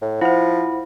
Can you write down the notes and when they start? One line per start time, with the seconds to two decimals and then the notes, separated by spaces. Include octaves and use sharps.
0.02 A2
0.21 F3 E4 C5 F#5